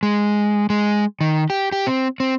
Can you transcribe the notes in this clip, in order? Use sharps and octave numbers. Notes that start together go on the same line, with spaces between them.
G#3
G#3
D#3
G4
G4
C4
C4